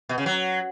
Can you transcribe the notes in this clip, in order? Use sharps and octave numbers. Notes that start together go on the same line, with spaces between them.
B2
C#3
F#3